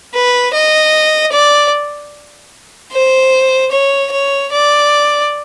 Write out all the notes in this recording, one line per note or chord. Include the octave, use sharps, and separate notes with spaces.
B4
D#5
D5
C5
C#5
C#5
D5